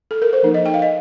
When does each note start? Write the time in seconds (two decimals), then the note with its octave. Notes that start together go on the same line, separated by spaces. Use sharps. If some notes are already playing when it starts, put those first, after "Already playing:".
0.11 A4
0.22 A#4
0.33 C5
0.43 F3 A#3 D#4
0.54 D#5
0.66 G5
0.74 F5
0.82 D#5